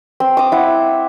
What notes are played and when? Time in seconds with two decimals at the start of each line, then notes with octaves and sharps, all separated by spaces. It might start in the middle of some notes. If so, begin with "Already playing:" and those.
0.20 C4
0.37 D6 D#6
0.52 E4 F#5